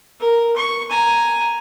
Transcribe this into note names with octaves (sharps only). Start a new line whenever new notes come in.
A#4
C#6
G#5 A#5